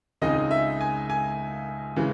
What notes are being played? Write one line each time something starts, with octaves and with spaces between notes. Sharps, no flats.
C#2 C#3 G#3 C4 D#4 D#5
E5
G#5
G#5
C#3 E3 G#3